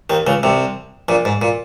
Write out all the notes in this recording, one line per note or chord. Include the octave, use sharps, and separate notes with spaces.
D#2 D#3
C#2 C#3
C2 C3
A#1 A#2
G#2
A#2